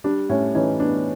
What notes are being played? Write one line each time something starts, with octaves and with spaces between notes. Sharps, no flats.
G3 D4
A2 C#4
E3 C#4 D#4
B3 D4